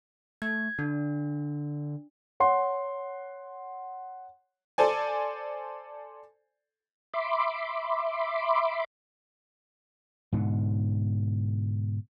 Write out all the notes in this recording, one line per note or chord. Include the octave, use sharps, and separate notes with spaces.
A3 G#6
D3 D4
C#5 F#5 C6
A4 C5 D5 G#5
E5 B5 C6 D6
G#2 B2 D3